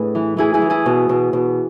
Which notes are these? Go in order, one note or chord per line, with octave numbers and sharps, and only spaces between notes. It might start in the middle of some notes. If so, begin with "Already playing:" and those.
Already playing: A2 D4 G#4 B4
E3
E3 E4 G#4
E4 G#4
E3
E4 G#4
B2
B2
B2